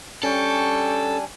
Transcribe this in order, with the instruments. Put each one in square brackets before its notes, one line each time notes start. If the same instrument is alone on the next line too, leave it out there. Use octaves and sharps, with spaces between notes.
[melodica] G3 D4 G#5 [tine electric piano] C#4 [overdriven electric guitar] A4 [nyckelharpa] G5 C#6